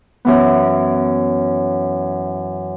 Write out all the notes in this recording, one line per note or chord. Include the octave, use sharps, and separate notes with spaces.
F#2 E3 B3